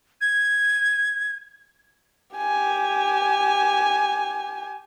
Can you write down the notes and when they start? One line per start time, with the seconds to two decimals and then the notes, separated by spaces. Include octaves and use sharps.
0.21 G#6
2.36 G4 G#5